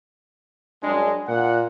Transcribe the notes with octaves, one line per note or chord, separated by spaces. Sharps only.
F#2 G3 G#3 D4
A#2 F#5